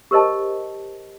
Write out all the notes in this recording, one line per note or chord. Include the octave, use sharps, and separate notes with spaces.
G4 A#4 C5 D#5 A5